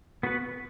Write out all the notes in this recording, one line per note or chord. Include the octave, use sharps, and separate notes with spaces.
B3 F#4 B4